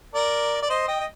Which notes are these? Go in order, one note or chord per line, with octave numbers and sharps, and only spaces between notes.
A#4 D5
D5
C5 D#5
D#5 G5
D#5